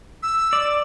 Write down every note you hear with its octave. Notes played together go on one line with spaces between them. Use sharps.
E6
D5